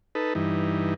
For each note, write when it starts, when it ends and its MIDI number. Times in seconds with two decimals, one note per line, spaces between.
0.15 0.33 63
0.15 0.33 69
0.15 0.33 71
0.35 0.94 43
0.35 0.94 52
0.35 0.94 63